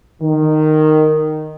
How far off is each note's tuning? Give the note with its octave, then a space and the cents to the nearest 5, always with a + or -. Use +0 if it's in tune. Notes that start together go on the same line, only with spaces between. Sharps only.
D#3 -10